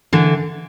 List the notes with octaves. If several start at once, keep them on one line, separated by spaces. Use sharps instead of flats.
D3 E3